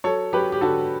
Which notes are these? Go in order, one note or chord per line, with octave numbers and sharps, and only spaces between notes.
F#3 A4 C#5
F#3 G4 B4
G4
D3 F#4 A4